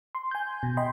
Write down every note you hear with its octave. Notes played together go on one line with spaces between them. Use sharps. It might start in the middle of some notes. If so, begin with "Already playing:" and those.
C6
G#5 G6
B2
D#5 G5 B5 C6